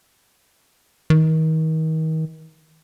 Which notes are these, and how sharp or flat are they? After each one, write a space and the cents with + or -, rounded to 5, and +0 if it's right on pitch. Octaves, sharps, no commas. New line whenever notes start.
D#3 +35